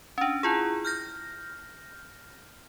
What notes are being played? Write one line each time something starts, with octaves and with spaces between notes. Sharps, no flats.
C#4 D4
E4 F4 G#4
F6 G6 A#6